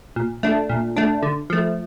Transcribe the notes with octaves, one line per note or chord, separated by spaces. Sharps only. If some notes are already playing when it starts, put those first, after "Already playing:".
A#2
A3 D4
A#2
A3 D4
D3
F3 A3